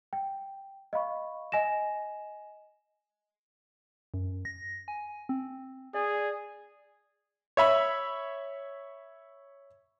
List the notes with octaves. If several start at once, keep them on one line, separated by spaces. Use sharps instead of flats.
G5
D#5 F5 B5 C#6
D#5 G#5 A#6 E7
F#2
A#6
G#5
C4
G#4 D5
C#5 E5 B5